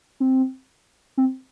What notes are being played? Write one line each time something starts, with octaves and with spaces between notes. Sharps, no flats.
C4
C4